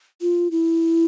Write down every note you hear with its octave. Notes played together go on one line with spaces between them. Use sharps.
F4
E4